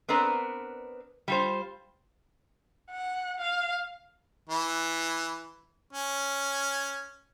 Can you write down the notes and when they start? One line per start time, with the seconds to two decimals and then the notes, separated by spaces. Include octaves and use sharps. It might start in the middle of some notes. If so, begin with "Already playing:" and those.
0.08 B3 C4 D4 A#4 B4
1.28 G3 F4 C5
2.90 F#5
3.39 F5
4.49 E3
5.93 C#4